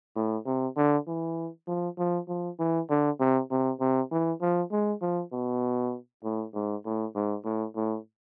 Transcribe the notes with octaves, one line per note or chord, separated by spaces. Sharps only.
A2
C3
D3
E3
F3
F3
F3
E3
D3
C3
C3
C3
E3
F3
G#3
F3
B2
A2
G#2
A2
G#2
A2
A2